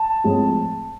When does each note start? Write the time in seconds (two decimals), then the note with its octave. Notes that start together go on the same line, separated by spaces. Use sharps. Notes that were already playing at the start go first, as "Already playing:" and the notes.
Already playing: A5
0.24 A2 F3 G#3 C4